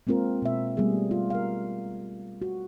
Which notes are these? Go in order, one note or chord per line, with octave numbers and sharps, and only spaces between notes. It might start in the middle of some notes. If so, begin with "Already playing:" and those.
G#3 A#3 C4 F4 A#4
B2 E5
G3 A3 B3 G#4
F4
A#4 F5
F#4